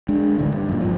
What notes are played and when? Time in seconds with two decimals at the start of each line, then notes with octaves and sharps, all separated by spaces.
0.09 G#3 D4
0.38 D1 A1 D3 E3
0.52 G2
0.69 F#2 A#2
0.81 D1 G2 F3